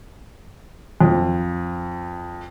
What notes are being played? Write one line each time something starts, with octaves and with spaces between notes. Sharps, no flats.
F2